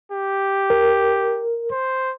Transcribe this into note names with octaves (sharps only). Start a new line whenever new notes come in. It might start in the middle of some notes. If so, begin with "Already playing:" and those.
G4
A#4
C5